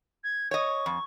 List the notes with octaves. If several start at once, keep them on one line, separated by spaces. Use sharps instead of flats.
G#6
C#5 D#5 C#6
F2